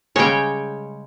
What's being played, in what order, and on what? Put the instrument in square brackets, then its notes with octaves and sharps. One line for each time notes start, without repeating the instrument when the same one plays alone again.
[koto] C#3 G3 G#3 [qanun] C#5 G5